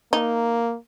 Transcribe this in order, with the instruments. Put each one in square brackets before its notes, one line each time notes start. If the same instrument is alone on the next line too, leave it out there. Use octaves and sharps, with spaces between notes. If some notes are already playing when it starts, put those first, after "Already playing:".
[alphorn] A#3 [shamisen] D#4